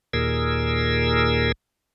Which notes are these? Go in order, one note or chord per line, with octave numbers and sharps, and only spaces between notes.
D#2 A#2 G#4 A#4 E6